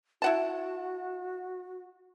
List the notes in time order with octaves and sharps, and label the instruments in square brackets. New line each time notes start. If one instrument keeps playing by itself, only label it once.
[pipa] E4 F#5 A5 [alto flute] F#4